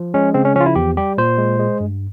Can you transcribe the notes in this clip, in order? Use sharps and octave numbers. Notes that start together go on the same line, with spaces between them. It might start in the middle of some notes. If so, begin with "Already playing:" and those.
Already playing: F3
G#3 C#4
C#3 C4
C#4
F3 C#4
F4
E4
E2 G4
G3 G4
A#2 C5
G#3
G#3
G2